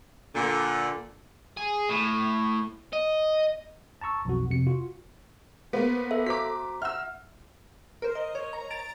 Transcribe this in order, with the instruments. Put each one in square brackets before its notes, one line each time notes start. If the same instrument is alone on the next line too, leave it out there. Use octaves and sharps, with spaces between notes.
[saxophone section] A#2 D3
[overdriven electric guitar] G#4
A2
D#5
[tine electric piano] A5 A#5 C#6 E6
B1 F2 F#4
F2 C3 C#7
F4 F#4
[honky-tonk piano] A#3 B3 [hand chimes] B4 C5 F5
[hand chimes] A4 E5 F5
[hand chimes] F#4 C5 A#5 [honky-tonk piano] D6 B6
[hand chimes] E5 F#5 [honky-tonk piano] E6 F6
[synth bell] A#4 C5
D#5
C#5
A#5
A#5 A6 D7 F7